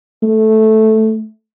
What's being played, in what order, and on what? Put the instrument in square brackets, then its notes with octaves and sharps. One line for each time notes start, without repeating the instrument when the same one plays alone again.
[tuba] A3